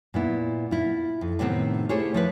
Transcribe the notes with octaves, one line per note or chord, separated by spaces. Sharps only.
A#2 B3 E4
E4 F4
F2
A2 C3 D#3 G3 B3 C4
A3 E4 G4 G#4 C5 C#5
F3 E4 B4